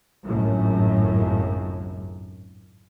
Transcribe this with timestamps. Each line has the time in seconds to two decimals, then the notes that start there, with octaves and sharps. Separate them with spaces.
0.23 G#1 C#2 F#2 A2